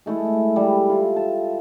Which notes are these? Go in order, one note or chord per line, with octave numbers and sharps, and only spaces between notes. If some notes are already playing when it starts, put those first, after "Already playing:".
G#3 A3 E4
G3
F4
A5